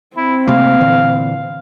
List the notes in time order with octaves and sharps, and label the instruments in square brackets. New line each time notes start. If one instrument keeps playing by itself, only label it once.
[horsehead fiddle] C4 [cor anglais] E4
[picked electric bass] C3 A3 A#3 [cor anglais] F5
[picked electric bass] A#2 D3 E3